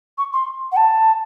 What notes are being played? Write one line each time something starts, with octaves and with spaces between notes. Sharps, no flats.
C#6
C6
F#5
A5